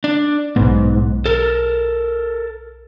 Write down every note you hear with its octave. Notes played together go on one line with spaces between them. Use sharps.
D4
B1 G#2 B3
A4 A#4